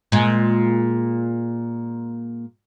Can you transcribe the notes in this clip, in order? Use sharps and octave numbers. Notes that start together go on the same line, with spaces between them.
A#2 G#3